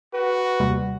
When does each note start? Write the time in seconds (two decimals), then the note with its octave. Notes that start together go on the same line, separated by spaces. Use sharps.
0.14 F#4 B4
0.60 D#2 C3 G3